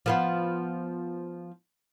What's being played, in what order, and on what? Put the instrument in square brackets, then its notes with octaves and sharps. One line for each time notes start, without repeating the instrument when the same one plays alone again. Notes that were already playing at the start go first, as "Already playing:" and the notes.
[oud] F3 B3 F4